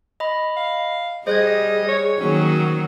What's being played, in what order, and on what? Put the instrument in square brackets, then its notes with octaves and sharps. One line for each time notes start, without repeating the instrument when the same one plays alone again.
[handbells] D#5 B5
[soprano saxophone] F5
[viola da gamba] G3 [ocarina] G#4 [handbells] C5 F#6 G#6 [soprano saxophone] D#5
[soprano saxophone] C#5
[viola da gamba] D#3 F#3 A#3 [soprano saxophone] C#4